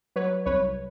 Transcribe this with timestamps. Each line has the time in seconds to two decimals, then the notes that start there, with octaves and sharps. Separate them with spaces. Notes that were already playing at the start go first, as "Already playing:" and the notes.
0.16 F#3 B4 C#5
0.46 C2 B4 C#5